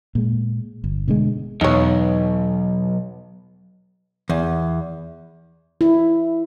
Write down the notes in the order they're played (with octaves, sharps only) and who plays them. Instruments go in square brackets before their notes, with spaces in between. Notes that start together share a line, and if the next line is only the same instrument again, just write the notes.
[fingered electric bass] A#2 G#3
G1
B2 D3 E3 G#3
[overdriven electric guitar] B1 [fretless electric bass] E2 B2 [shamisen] D#4 C#5
[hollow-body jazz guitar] E2
[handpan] E4